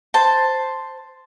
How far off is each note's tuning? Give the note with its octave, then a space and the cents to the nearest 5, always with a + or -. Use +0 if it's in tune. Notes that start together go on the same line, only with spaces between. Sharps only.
C5 +0 A5 +5